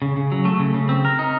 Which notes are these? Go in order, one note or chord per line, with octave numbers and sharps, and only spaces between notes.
C#3
C#3
F#3
A3
C#3
C#3
C4
A#4
D#4